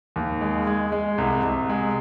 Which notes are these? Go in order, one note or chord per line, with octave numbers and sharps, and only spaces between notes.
D#2
G#3
G#3
G#3
C2
C2
G#3